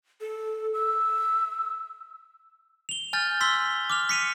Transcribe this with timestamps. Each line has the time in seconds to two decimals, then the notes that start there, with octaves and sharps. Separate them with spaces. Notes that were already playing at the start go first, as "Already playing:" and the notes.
0.21 A4
0.74 E6
2.89 F7 G7
3.13 G#5 F6 G6 A6
3.40 C6 E6 B6 G7
3.90 D6 F6 F7
4.09 B6 C#7 D#7 F7